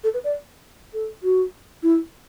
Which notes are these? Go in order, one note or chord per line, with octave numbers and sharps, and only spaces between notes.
A4
B4
D5
A4
F#4
E4